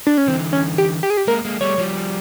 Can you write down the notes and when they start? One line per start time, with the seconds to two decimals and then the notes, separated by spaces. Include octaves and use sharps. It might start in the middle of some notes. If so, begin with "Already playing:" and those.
0.07 D4
0.18 C#4
0.28 D3 E3 C4
0.53 C#4
0.78 G4
1.03 G4
1.10 G#4
1.17 G4
1.27 G#3 A#3 A#4
1.45 G#3 A#3
1.61 G3 A3 C#5
1.78 F3 G3